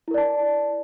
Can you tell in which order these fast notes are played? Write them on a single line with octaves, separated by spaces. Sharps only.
E4 A#4 D5 A5